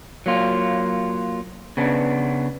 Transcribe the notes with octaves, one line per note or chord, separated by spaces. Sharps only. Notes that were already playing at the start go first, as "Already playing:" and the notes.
F#3 A#3 F4
C#3 B3 D4